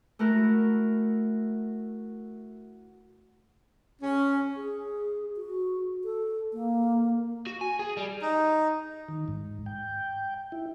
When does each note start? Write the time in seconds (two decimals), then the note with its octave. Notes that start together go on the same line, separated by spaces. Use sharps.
0.19 A3 E4 F#4 A#4
4.02 C#4
4.56 G#4
5.37 F#4
6.04 A4
6.53 A#3
7.47 F#4
7.61 G#5
7.79 G#4
7.97 G3
8.22 D#4
9.08 D#3
9.28 G#2
9.66 G5
10.52 E4